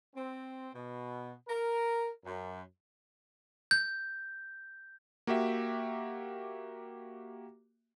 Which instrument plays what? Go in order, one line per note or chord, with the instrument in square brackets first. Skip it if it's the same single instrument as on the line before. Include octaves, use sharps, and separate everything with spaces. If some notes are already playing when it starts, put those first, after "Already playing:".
[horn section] C4
B2
A#4
F#2
[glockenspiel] G6
[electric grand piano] A#3 F#4 G4 E5